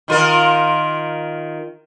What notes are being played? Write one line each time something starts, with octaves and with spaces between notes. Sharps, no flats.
D#3 F4 A#4